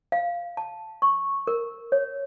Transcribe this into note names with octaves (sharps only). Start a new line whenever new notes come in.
F5
A5
C#6
A#4
C#5